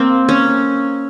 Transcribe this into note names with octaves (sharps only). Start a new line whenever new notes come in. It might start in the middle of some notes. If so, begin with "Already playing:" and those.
Already playing: A#3 C4
C#4